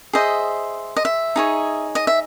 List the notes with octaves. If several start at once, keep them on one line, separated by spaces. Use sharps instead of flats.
G#4 C5 D#5 E5
D#5
E5
D#4 G#4 C#5
D#5
E5